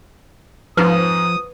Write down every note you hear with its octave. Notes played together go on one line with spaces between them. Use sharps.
F2 G#2 F3 B4 D#6 F6